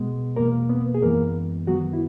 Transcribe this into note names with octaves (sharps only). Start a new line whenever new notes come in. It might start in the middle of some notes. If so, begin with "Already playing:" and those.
Already playing: B2 G#3 B3
E2 B2 A#3 A#4
B3 B4
G#4
F#2 E3 G#3 A#3 B3 A#4
F#2 D#3 F#3 B3 F#4
E4